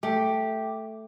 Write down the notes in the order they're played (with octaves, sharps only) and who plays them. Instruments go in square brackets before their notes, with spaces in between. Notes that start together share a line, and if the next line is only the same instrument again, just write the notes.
[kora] A3 [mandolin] G4